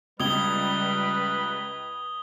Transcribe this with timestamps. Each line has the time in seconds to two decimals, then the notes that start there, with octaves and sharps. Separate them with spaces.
0.20 C#2 G3 B4 D#6 G#6 G7